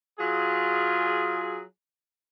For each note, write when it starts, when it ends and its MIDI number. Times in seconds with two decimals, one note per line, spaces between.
0.19 1.61 54
0.19 1.61 65
0.19 1.61 68